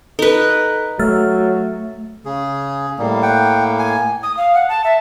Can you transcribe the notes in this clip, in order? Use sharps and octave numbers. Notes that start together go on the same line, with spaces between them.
D#4 A4 B4
F#3 A3 E6 F6 A6
C#3 G#4
A2 G3 A#3
F#5 G5
G#5
D#6
F5
F#5
A5
E5